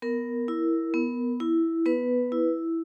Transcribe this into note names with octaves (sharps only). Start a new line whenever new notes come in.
B3 A#4
E4
B3
E4
B3 B4
E4